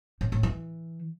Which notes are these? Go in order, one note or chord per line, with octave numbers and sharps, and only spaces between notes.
A2
A2
E3